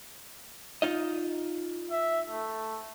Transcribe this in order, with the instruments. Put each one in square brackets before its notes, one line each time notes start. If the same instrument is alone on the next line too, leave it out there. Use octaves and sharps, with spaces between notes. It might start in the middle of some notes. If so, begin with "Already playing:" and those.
[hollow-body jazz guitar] D#4 F4 D#5
[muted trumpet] E5
A3